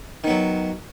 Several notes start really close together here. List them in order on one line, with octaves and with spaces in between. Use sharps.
D#3 B3 F#3